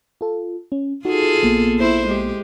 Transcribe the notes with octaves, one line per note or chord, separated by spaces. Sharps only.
F4 A4
C#4
D#4 F4 F#4 G#4 A4
A#1 A#3 B3
E4 C5
G#3 G4